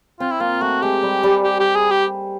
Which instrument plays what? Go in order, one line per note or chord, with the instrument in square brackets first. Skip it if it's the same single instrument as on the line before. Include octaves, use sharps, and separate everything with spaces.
[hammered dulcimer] C4 [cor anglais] F4
[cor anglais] E4
[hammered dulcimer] A#3 [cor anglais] F4
[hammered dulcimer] A3 [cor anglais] F#4
[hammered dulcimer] G#3 [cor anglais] G4
[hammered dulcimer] G3
G3
[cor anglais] G4
G4
G#4
G4